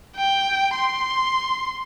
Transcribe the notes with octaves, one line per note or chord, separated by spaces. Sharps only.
G5
C6